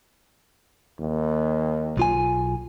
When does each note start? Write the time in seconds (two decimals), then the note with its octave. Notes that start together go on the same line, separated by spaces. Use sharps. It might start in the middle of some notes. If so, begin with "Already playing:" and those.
0.99 D#2
1.97 B1 F4 G#5